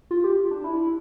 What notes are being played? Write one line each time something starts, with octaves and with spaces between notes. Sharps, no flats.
F4
G4
D4
E4